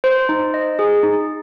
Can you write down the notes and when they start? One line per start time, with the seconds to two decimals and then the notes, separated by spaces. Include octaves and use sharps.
0.04 C5
0.29 D#4
0.54 D#5
0.79 G#4
1.03 D#4